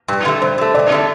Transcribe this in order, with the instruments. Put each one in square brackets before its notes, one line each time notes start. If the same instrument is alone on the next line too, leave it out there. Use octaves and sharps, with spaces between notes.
[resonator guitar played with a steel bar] G2
D3 A3
[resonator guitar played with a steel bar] G2 [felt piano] C5
[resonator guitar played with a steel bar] D3 A3
[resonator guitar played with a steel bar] G2 [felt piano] D5
[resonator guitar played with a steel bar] D3 A3